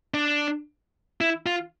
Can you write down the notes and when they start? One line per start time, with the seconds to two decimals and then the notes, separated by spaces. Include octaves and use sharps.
0.14 D4
1.21 E4
1.46 F4